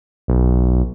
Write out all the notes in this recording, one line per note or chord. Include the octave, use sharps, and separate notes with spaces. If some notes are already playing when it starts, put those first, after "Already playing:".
B1